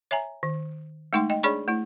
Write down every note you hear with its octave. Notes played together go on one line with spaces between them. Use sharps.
C#5 E5 G#5 A#5
D#3
G#3 A3 D#4 G5 C6
D#5 G5
D4 G#4 C#5 D5 B5 C#6
A3 E4